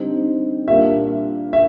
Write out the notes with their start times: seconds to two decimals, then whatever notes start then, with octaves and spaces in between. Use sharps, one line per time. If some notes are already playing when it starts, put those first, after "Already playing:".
Already playing: D3 G3 C4 D#4
0.68 A#2 G3 A#3 D4 E5
1.53 E5